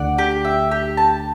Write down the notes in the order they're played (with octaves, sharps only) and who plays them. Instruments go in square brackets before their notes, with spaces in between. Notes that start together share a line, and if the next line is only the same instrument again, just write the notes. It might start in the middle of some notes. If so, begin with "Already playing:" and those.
Already playing: [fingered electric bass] D2 D3 [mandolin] D5 F#5
[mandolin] G4
E5
G4
A5